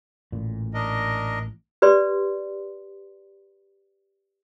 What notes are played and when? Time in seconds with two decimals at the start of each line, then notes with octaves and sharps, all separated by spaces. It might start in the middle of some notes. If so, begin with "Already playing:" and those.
0.32 A1 A#2
0.74 D4 A#4 D#5
1.82 G4 B4 D5 C6